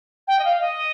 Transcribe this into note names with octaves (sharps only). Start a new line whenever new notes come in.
G5
D#5
F5
D#5